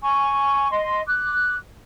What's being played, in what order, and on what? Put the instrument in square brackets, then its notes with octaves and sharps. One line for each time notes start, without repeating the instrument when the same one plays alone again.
[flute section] G#5 C#6
D#5 C6
D6 F#6